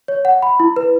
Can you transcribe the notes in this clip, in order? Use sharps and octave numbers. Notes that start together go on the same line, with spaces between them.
C#5
F#5
B5
E4
B4